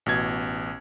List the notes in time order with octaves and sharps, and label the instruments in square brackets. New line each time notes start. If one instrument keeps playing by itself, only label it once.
[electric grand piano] A1 B2 G#6